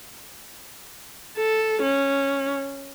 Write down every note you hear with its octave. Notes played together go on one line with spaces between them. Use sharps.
A4
C#4